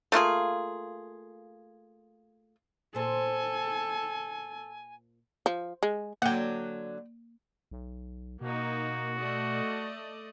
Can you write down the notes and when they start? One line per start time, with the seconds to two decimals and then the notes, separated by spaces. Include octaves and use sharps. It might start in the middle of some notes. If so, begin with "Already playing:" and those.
0.12 A3 A#3 F4 G#4
2.95 A#2 A4 C5 G#5
5.46 F3
5.83 G#3
6.22 D3 F#3 A#3 F#5 G5
7.71 B1
8.41 B2 A#3 D#4 F#4
9.18 A3 D5 D#5